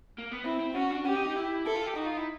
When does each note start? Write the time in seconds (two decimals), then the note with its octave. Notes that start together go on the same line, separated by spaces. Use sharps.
0.18 A#3
0.31 B3
0.44 C4 E4
0.60 C4
0.74 C#4 F#4
0.90 D4
1.05 C#4 G4
1.15 D#4
1.26 D#4
1.36 E4
1.66 E4 A4
1.76 F4
1.87 G4
1.96 D#4 F#4
2.07 F4
2.17 E4